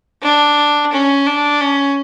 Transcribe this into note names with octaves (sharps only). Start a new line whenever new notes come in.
D4
C#4
D4
C#4